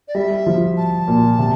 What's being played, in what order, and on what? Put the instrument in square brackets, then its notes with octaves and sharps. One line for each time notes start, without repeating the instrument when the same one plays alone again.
[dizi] D5
[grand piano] G3 [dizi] E5
[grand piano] G3
F3
[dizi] A5
[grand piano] A#2
C3